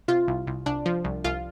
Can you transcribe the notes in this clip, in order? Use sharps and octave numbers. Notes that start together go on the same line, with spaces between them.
C3 F4
C2
C2
C2 D4
F3
C2
C2 F4